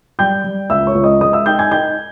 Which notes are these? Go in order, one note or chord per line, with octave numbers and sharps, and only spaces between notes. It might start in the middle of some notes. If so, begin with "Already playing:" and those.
G3 G5 G6
G3
C#2 E5 E6
C#5 C#6
C#2
D#5 D#6
G#3 D#5 D#6
E5 E6
D#4 G5 G6
G#5 G#6
D#4 G5 G6